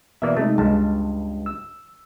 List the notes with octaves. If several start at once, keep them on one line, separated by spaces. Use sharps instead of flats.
B2 E3 A#3 D5 E5
C3 G#3 A3 D#4
C#2 G2 G#3 A5
E6